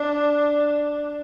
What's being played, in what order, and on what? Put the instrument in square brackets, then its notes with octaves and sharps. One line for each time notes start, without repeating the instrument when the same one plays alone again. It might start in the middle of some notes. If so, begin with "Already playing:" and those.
Already playing: [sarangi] D4